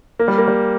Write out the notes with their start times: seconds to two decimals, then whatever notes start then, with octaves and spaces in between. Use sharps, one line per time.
0.19 A#3
0.28 G3
0.38 A#3
0.48 G3